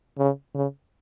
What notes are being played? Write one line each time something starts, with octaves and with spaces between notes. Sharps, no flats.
C#3
C#3